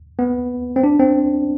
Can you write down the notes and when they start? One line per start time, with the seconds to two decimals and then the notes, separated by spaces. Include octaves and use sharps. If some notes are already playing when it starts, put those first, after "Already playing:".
0.19 B3
0.76 C4
0.83 D4
1.00 C4